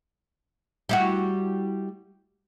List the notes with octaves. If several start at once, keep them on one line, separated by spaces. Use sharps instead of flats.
G3 E4 F#4